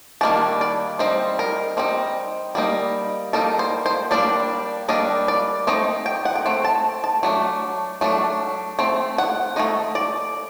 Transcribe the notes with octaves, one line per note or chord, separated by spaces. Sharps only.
D#3 G3 A#3 D4 A5
D5
G3 C4 D#4 C5
A#4
G3 C4 D#4
G3 A#3 D#4
G3 A#3 D#4 A4
C5
C5
G3 A#3 D4 D5
G3 A#3 D4 D#5
D5
A3 C4 D#4 D#5
G5
F#5
G5
A3 C4
A5
A5
F#3 A3 D4
F#3 A3 D4
A3 C4
F#5
A3 C4 D#4 D#5
D5